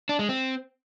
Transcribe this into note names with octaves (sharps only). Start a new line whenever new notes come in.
D4
G#3
C4